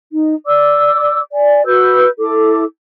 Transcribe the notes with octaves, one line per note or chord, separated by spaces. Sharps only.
D#4
D5 D6 E6
D5 G#5
F#4 B4 E6 G6
E4 A4 D6